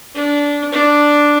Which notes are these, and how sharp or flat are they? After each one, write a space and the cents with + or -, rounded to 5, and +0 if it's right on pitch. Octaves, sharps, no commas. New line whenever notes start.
D4 -20
D4 +0